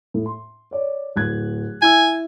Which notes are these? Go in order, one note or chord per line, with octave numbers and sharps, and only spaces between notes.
A2
C6
C#5 D5
D1 F#6 G#6
E4 G#5 E6